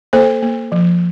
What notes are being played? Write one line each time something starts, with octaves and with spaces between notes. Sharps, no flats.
A#3 A4 C5
A#3
F3